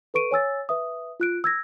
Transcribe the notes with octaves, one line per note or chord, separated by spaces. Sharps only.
A4 B4 C#6 D7 D#7
C#5 G#5 E6 A6
B4 E5 D#6
F4 F#6 D7
E6 G#6 A#6